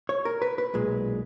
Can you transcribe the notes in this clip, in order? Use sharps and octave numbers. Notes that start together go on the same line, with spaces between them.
C#5
A#4
B4
B4
B1 A#2 G#3